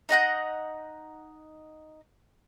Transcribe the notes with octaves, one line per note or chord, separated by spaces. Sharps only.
D#4 D#5 F#5 G6